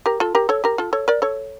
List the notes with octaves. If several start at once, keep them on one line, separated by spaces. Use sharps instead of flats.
G4 A#4
F4 A4
G4 A#4
A4 C#5
G4 A#4
F4 A4
A4 C#5
A#4 D5
A4 C#5